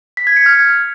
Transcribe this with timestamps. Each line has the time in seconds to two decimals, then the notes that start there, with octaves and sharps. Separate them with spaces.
0.17 B6
0.27 G#6
0.36 C#7
0.46 F6